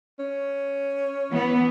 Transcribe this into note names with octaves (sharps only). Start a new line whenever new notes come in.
C#4
E3 B3